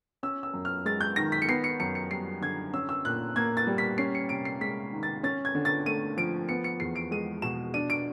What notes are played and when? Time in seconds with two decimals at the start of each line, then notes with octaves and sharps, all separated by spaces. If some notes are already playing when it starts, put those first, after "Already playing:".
0.23 C#4 E6
0.43 E6
0.54 F#2
0.65 F6
0.85 G#3 A6
1.01 G6
1.16 D#3 A#6
1.32 B6
1.42 C#7
1.48 B3 C7
1.64 C#7
1.80 F#2 C#7
1.95 C#7
2.10 G3 C7
2.41 D3 G#6
2.73 C#4 E6
2.89 E6
3.05 A#2 F#6
3.36 A#3 G#6
3.57 A6
3.67 G3
3.78 B6
3.98 C#4 C7
4.15 C#7
4.29 C3 D7
4.45 C7
4.61 G#3 B6
4.92 D#3
5.03 A6
5.23 C#4 A6
5.45 G#6
5.55 D3
5.65 A6
5.86 A3 D#7
6.17 F3 D7
6.48 B3 C#7
6.64 C#7
6.80 E2 C7
6.96 D7
7.11 G#3 D#7
7.42 B2 E7
7.74 D4 D#7
7.90 D7